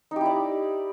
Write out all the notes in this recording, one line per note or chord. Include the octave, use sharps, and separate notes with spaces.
D#4 E4 G4 D5